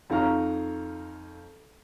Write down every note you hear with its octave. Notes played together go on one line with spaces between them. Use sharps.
F2 D#4 F5 A#5 C#6 F6